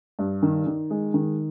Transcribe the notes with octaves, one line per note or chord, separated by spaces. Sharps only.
G2
D#3
D#3
G#3
D#3